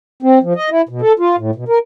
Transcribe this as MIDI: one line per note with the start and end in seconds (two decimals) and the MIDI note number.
0.23 0.39 60
0.43 0.53 53
0.56 0.70 75
0.70 0.82 64
0.89 1.01 47
1.01 1.12 69
1.19 1.36 65
1.38 1.51 45
1.55 1.64 47
1.69 1.79 70